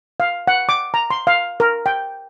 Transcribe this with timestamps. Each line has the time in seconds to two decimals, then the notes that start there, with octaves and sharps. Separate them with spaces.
0.20 F5
0.47 F#5
0.69 D6
0.94 A#5
1.11 C6
1.27 F5
1.60 A#4
1.86 G5